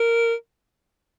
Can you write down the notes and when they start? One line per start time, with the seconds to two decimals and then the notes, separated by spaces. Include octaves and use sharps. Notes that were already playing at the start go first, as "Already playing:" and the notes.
Already playing: A#4